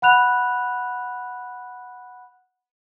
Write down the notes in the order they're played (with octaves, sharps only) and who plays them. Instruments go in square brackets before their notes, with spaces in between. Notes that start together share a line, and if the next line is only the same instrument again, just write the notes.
[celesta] F#5 B5 F#6 F7